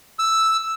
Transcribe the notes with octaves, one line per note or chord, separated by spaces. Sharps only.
E6